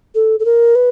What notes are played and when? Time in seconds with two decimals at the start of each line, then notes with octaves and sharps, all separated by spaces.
0.15 A4
0.40 A4
0.45 A#4
0.75 B4